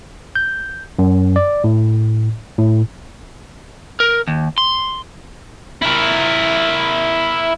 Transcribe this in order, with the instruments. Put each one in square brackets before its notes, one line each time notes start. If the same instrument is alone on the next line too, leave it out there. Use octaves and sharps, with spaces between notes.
[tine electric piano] G6
F#2
D5
A2
A2
[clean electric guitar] A#4
D#2
C6
[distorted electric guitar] E4 A#4